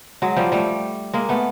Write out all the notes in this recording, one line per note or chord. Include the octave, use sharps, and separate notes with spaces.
F#3 G#3
F3 G3
G3 A3
G#3 A#3
A3 B3